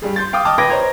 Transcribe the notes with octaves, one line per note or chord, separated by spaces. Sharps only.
G2 G3 G#4
C6 G6 A6
F5 G5 D6 D#6
D#5 G5 A5 D6 D#6 F6
B4 G5 D6 G#6 A#6 D7
C5 C#5 D#5 A#5 C6 G#6